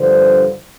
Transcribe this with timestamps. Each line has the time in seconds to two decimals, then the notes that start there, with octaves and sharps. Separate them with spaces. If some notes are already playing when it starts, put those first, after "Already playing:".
Already playing: G2 D3 F3 C5